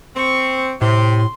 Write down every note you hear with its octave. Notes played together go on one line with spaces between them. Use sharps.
C4 C#6
A2 C3 C6